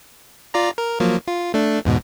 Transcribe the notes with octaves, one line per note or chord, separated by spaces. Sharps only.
F4 D5 A#5
A#4
F3 F#3 A#3
F4
A3 D4
E2 G#2 B2